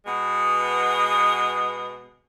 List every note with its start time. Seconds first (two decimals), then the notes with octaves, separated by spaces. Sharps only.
0.06 B2 G#3 B3